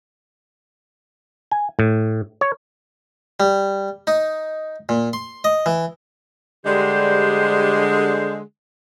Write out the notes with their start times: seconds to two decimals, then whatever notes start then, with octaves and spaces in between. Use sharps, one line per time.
1.51 G#5
1.79 A2
2.41 C#5
3.40 G3
4.07 D#4
4.89 A#2
5.13 C6
5.44 D#5
5.66 E3
6.66 D3 G3 G#3 G4 C5